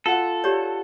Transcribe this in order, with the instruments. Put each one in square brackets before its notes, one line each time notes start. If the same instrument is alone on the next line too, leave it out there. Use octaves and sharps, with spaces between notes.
[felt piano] F4 F#5 [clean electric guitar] A4
[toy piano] G4 C#5 D5